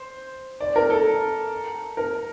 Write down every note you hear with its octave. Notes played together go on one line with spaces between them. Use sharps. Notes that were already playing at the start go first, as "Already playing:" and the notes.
Already playing: C5
D5
A#4
A4
A#4